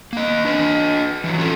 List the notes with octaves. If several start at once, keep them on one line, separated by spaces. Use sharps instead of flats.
A#3 D#5
D4 B4 D#5
E3 F#3
C#4 F4 A4